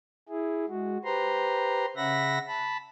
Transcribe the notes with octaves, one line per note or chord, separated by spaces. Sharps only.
E4 G#4
G#3 F#4
G4 B4 C5 A#5 C6
C#3 C#4 E5 F#5 B5 A#6
A5 B5